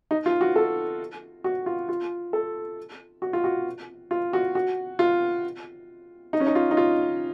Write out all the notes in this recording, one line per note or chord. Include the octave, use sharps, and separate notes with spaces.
D#4
F4
F#4
A4
F#4
F4
F4
A4
F#4
F4
F#4
F4
F#4
F#4
F4
D#4
C#4
D#4
F4
D#4
F4